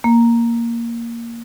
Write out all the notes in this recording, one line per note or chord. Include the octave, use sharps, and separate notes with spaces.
A#3